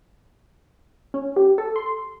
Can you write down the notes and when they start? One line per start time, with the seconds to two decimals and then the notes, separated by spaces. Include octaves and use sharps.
1.14 C#4
1.36 G4
1.58 A4
1.76 C6